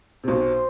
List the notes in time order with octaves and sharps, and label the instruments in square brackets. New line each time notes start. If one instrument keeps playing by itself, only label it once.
[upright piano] C3
[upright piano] B1 B2 [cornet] C5